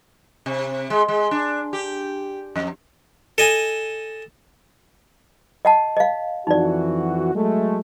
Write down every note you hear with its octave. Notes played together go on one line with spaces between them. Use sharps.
C3
G#3
G#3
D4
G4
F2
A4 D#5 G#5
D#5 F#5 A5
D#5 F5
F2 E3 D#4 F#4 D5
F#3 G#3 A3